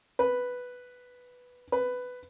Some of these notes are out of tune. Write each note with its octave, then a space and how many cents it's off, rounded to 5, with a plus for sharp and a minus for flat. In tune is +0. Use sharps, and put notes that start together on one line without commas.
B4 +0
B4 +10